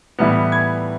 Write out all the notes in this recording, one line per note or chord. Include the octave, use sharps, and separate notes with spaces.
A2 E3 G3 B3
G#6